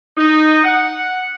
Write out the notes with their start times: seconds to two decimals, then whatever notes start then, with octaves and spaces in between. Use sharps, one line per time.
0.17 D#4
0.64 F#5